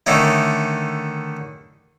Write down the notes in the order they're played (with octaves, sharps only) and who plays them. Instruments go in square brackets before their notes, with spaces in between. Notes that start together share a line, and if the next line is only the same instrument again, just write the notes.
[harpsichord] D3 D#3 A3 C#4 D#4 E4